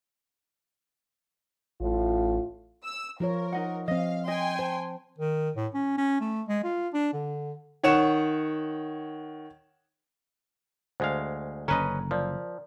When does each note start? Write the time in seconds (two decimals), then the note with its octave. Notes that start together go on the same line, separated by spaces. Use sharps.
1.80 A1 A2 F4
2.84 E6
3.20 F3 F4 A#4 C#5
3.52 D#4 D#5 F#5
3.88 F3 C4 D#5 F5
4.28 D#5 G5 G#5 C6
4.59 C5 A5
5.18 D#3
5.56 A2
5.74 C#4
5.98 C#4
6.21 A3
6.48 G#3
6.64 F4
6.94 D4
7.13 D3
7.83 D#3 C#5 F#5 E7
11.00 D2 G#3 C5 F5
11.68 F#1 D3 C#4 B4 D#5 A#5
12.11 F3 A#4 D5